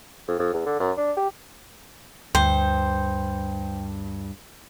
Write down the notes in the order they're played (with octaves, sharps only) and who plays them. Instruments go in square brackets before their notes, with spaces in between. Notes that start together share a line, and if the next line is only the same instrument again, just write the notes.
[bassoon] F2
F2
E2
D3
F#2
D4
G4
[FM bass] D2 [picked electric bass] G2 [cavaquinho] C5 [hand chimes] G5